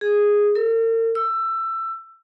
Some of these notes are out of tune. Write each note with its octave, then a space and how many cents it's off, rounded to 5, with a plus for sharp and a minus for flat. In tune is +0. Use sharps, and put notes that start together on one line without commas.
G#4 -5
A#4 -45
E6 +20